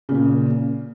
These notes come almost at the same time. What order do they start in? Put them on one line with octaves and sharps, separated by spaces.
C#3 A#2 A#3